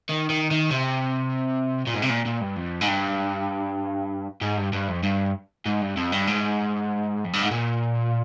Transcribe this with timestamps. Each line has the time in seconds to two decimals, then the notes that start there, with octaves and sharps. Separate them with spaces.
0.09 D#3
0.29 D#3
0.51 D#3
0.71 C3
1.87 A#2
1.94 G#2
2.02 C3
2.09 A#2
2.25 A#2
2.41 G2
2.56 F2
2.81 G#2
2.88 G2
4.42 G#2
4.57 G2
4.73 G2
4.88 F2
5.03 G2
5.66 G#2
5.81 G2
5.97 F2
6.12 G2
6.27 G#2
7.25 F2
7.33 G2
7.43 G#2
7.51 A#2